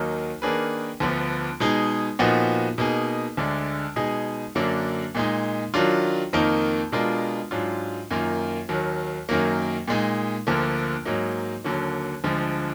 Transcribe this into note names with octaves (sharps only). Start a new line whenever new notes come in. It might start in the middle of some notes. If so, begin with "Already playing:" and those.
Already playing: D#2 D#3 F#3 A#3 D#4
D#3 A#3 D4 G#4 B4
D2 D3 F3 B3
B2 G#3 D#4 G#4
A#2 F3 B3 D#4 F#4
B2 A#3 D#4 G#4
D2 D3 G#3 D4
B2 G#3 D#4 G#4
F#2 D3 F#3 A#3 D4
A#2 G#3 D#4
D#3 F#3 D4 F4
F2 D#3 A#3 D#4
B2 G#3 D4 F4 A#4
G#2 F#3 D4 F4
F#2 D#3 A#3 F4
D#2 D#3 F#3
F#2 D#3 F#3 A#3
A#2 G#3 D#4
D2 D3 F3 A#3
G#2 F#3 A#3 D#4
D#2 D3 F#3 A#3
D2 D3 F3 G#3